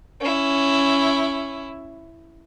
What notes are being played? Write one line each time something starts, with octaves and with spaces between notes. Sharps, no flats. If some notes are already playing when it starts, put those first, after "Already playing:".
C#4 E4